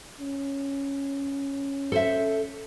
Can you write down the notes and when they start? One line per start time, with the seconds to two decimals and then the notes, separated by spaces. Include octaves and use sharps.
0.20 C#4
1.92 A4 C5 E5